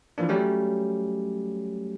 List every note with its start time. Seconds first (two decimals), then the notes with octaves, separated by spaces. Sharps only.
0.18 E3 F3 A#3 D4
0.29 F#3 G3 A3 C#4